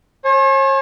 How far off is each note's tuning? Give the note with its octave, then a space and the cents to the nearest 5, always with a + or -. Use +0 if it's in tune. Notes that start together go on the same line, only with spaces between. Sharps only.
C#5 -45 G#5 +40